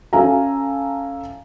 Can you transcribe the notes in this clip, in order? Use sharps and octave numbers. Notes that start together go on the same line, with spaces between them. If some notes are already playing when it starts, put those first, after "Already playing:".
C#4 A4 E5 F5 G#5 A#5